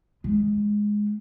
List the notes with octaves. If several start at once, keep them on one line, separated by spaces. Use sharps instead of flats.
G#3